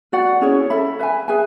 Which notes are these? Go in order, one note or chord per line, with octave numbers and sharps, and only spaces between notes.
F#4 B4 D5 F#5
C#4 E4 G#4 C#5
A4 E5 B5
B4 E5 G#5
G#4 B4 E5 G#5